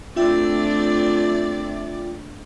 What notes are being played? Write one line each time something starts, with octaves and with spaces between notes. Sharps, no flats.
A3 C4 D4 F4 D5 E5 G5